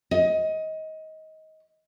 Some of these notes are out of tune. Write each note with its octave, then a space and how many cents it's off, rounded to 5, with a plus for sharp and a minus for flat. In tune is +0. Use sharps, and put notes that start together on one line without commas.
D#5 +20